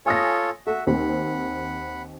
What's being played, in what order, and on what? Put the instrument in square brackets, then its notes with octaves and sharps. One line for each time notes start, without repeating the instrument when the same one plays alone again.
[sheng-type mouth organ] F4 A4 C#5 [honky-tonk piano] G#5 D#6 A#6
[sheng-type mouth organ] F#4 E5 [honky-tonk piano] A4
[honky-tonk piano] D#2 C4 [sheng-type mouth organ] F#5 B5